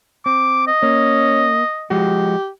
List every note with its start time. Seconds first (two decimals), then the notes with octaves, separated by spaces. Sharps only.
0.26 C4 D6
0.67 D#5
0.83 A#3 C#4
1.90 F3 G#3 F#4 G4